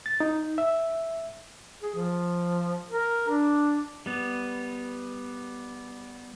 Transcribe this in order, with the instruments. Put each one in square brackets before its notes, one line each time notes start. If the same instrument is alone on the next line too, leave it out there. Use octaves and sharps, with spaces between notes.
[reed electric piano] A6
D#4
E5
[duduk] G#4
F3
A#4
D4
[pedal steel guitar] G3 B3